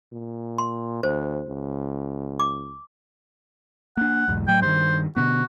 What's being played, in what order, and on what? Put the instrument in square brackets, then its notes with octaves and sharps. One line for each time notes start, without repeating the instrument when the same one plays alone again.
[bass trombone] A#2
[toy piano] C6
[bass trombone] D2 [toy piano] C5
[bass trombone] C#2
[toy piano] D6
[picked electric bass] A#3 D4 [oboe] F#5
[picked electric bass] B1 E2 G#2
[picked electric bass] A2 F#3 A3 [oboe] G5
[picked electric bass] G2 D#3 [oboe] C5
[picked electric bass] B2 D3 B3 [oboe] F#4